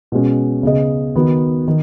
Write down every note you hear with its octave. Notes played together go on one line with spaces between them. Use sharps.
B2 G#3 C#4
C#3 B3 G#4 D#5
D#3 B3 F#4
D#3